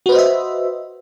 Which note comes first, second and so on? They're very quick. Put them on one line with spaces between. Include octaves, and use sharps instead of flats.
F#4 B4 C5 D#5 E5